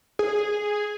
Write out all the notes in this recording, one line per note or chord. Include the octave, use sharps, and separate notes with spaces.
G#4